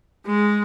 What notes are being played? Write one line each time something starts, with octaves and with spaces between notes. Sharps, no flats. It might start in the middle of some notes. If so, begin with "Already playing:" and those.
G#3